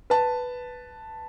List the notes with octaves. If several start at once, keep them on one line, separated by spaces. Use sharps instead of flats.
B4 A5